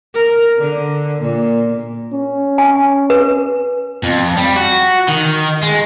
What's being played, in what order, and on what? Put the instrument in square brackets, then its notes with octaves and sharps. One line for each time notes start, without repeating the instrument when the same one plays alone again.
[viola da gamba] A#4
D3
A#2
[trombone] C#4
[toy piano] G#5
B4
[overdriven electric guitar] F2
G3
F#4
D#3
G#3